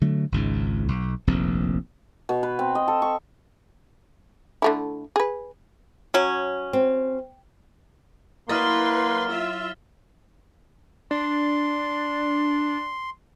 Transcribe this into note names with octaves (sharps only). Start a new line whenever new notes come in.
D3 F#3 A3
G#1 C#2 G#2
B1
F1 A#1 D#2 C4
B2
B4
C4
D#5
A4
C#6
D3 A3 E4
G#4 B4
F#3 C#4
C4
F#3 A#3 E4 B4 D#5 C6 F6 A6
F4 E5
D4 C6